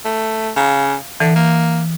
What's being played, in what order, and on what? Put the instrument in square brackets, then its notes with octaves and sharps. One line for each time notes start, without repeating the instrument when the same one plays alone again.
[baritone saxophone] A3
[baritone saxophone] C#3 [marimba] F5 A#5
[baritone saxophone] D3 [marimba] E3
[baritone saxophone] A#3